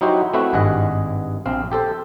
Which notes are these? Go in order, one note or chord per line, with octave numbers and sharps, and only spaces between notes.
F#3 D#4 E4 F#4 G4 C5
A3 C4 E4 F#4 B4 E5
G#1 G2 G#4 D#5 F#5
A#1 C4 F5
G4 A4 C5